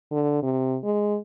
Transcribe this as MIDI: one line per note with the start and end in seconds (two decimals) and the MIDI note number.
0.12 0.39 50
0.43 0.78 48
0.84 1.17 56